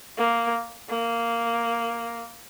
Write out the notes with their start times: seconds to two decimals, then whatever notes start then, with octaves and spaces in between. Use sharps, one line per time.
0.18 A#3
0.89 A#3